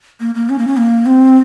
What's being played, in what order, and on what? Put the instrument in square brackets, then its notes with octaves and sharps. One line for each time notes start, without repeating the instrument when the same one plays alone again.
[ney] A#3
A#3
C#4
A#3
C#4
A#3
C4